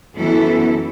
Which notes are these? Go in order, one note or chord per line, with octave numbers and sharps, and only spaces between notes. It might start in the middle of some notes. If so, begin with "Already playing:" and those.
F#2 E3 B3 E4 A4